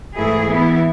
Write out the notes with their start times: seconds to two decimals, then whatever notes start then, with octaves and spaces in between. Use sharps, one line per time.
0.17 G#2 E3 A3 E4 G#4
0.50 E3 B3 E4